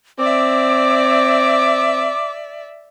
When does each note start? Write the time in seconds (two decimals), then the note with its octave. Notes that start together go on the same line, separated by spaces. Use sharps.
0.19 C4 D5 E5 D6